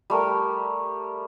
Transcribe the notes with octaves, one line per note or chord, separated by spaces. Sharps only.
G3 A3 A#4